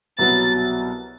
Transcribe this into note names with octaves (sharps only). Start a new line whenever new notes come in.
C2 B2 F#3 B3 A6